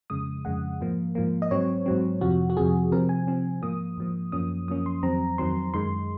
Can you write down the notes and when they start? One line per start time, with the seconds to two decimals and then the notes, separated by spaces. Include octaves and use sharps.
0.10 F2 C#3 G#3 D#6
0.45 F2 C#3 G#3 F#5
0.81 G#2 F3 A#3
1.15 G#2 F3 A#3
1.42 D#5
1.51 G#2 F#3 C4 C#5
1.86 G#2 F#3 C4
2.21 F2 C3 F3 F#4
2.50 F#4
2.57 F2 C3 F3 G#4
2.92 C3 F3 C4 A#4
3.09 G#5
3.27 C3 F3 C4
3.62 G#2 F3 A#3 D#6
3.97 G#2 F3 A#3
4.32 F#2 F3 A#3 C#4 D#6
4.68 F#2 F3 A#3 C#4 D#6
4.86 C6
5.03 F2 D#3 F#3 C4 A#5
5.38 F2 D#3 F#3 C4 C6
5.74 F#2 D#3 G#3 C6